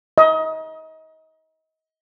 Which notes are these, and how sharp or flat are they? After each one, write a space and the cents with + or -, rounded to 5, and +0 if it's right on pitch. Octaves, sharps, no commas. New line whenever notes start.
D#5 +30